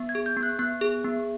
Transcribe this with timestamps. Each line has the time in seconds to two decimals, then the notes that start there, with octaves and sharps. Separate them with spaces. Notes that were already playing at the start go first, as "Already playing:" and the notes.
Already playing: B3
0.09 G#6
0.15 G#4
0.26 G6
0.37 B3
0.43 F#6
0.59 B3 F#6
0.81 G#4
1.05 B3